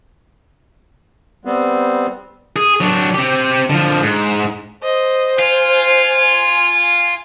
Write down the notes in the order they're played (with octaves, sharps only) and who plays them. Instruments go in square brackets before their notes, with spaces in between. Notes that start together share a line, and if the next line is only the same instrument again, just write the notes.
[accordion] G3 B3 C4
[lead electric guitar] G#4
F#3 D4
C4 G4
D3 F3
G#2
[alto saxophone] C5 [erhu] D#5
[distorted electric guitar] F4 [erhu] G#5